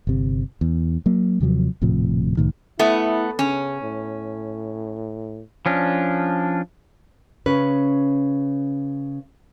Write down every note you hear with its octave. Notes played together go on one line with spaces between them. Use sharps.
G1 C3
E2
F#3 A#3
D#2 C3 F3 F#3
D#1 A2 C3 F3
C2 A2 D#3
A3 B3 E4
C#3 C#4
A2
F3 C#4 D4
C#3 C#4 B4